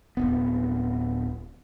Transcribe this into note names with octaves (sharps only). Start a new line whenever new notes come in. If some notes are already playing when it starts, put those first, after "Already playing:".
D1 D#2 B3